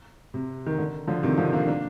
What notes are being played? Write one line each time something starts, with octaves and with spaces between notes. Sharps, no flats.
C3
D#3
D3
D3 F3
C3 D#3
D3 F3
A#3 D4
A#3 D4